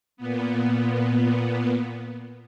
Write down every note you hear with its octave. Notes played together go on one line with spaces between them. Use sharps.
A#2 B3